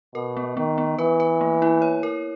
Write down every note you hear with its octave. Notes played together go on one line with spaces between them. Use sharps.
B2 A#4
B3
D#3 B3
B3
E3 B4
B4
A#3
E4
C#5
A#4